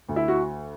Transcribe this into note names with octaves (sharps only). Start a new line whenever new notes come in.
D2
E4
F#4